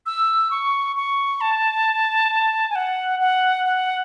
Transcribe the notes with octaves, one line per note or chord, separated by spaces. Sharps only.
E6
C#6
C#6
A5
G#5
F#5
F#5
F#5